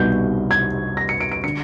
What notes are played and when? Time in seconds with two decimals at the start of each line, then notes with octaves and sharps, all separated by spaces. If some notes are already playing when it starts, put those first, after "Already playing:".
Already playing: C2 B2 G3 B3 D#4 G6
0.51 G#6
0.97 A#6
1.09 C#7
1.21 D7
1.32 D7
1.44 D3 C#7